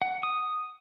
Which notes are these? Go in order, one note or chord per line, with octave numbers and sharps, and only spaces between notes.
F#5
D#6